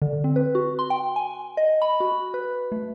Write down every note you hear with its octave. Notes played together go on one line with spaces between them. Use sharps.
D3
C4
B4
F#4
C6
G5
G#5
D#5
B5
F#4
B4
A3